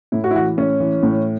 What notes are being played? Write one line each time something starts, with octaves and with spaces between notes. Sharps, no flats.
A2 E4
F#4
E4
E3 F#4
A2 C#4
E3
A2